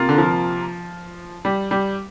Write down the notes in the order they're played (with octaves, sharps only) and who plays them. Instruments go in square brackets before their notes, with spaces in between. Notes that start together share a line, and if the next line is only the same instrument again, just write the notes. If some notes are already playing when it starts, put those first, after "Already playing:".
Already playing: [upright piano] C3 A#3 F4 A#4
[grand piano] D3
F3
G3
G3